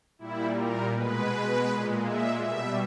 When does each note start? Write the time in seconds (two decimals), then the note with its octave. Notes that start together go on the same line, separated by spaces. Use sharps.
0.19 A#2 G3 E4
0.56 A#4
0.94 B2 G#3 B4
1.67 A#2 G#3
2.04 E5
2.42 B2 G3 E5